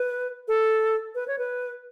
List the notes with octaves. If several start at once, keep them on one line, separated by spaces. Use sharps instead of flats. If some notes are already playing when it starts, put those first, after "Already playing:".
Already playing: B4
A4
B4
C#5
B4